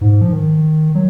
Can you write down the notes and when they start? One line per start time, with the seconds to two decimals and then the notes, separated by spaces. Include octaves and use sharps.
0.01 G#2
0.21 F3
0.32 D#3
0.95 F#3